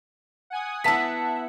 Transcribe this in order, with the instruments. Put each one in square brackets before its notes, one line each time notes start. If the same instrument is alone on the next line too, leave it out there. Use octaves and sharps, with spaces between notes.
[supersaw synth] F#5 G#5 D#6
[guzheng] B3 E4 [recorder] E5 [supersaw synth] F#5 [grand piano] A5 B6